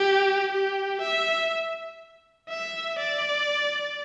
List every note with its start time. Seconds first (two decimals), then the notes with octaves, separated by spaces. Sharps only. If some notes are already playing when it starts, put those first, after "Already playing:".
Already playing: G4
0.52 G4
1.02 E5
2.49 E5
2.99 D5